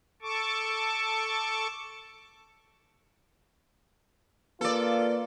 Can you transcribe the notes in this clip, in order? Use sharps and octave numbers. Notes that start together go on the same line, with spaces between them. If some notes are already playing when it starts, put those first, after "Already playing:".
A4 A5 C#6 D6
A#3 F4 A4 B4 D5